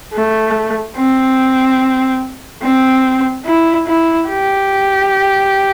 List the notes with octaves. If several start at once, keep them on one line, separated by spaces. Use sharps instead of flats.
A3
C4
C4
E4
E4
G4